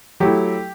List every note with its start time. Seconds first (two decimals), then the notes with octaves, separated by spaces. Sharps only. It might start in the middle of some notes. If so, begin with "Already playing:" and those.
0.20 F#3 A3 E4 G4